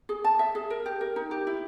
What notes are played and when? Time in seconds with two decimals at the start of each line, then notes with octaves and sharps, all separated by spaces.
0.09 G#4
0.24 A5
0.39 E5
0.55 G#4
0.70 A#4
0.86 G4
1.01 A#4
1.16 D#4
1.31 G4
1.47 E4